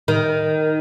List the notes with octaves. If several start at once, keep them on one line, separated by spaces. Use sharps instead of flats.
D#3